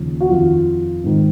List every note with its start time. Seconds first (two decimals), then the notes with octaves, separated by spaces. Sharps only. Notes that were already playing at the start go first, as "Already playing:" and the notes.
Already playing: D#2 C#3 F3
0.21 F#4
0.29 F2 D#3 F4
1.04 G#2 D#3